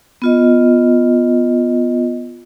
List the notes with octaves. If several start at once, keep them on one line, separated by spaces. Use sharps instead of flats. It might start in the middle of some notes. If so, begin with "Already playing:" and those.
B3 F4 D#5